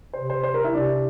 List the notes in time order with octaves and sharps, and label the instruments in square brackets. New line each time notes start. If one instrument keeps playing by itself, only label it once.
[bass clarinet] C3 [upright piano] C5
[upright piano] C5
C5
A#4
E4
[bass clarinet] C3 [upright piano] D4